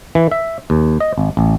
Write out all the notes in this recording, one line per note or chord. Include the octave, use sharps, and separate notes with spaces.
E3
E5
D#2
D#5
G#1
A1